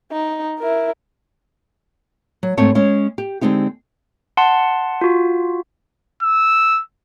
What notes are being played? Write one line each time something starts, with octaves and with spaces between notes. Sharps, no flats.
D#4
E4 A#4
F#3
G#2 A3 C4 C#5 A5
G#3 C#4 C#5
G4
D3 G#3 C4 D#4 G4
F#5 A5 C6
F4 F#4
E6